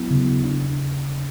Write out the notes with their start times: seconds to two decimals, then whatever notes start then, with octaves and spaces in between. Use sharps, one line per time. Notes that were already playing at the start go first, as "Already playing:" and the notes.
Already playing: F#3 B3 E4
0.10 C#3
0.44 D4